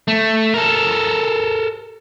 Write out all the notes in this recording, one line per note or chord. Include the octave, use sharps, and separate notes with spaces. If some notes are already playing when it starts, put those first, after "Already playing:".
A3
A4 A#4